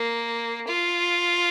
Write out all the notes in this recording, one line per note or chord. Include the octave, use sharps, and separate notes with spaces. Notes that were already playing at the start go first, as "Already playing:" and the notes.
Already playing: A#3
F4